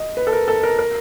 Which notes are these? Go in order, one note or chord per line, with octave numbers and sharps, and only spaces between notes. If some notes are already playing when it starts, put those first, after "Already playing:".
Already playing: D#5
B4
A4
A#4
A4
A#4
A#4